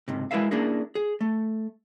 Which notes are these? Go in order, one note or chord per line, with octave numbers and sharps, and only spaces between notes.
C#2 G#2 C3
G#3 E4 A#4 B4 E5 F5
A#3 C#4 D4 E4 G#4 A#4
G#4
A3